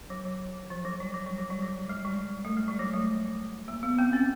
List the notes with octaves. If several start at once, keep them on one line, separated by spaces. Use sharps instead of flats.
F#3
F#3
F3
F#3
G3
F#3
G3
F#3
G3
F#3
G#3
G3
A3
G#3
G3
F#3
A3
A#3
B3
C4
C#4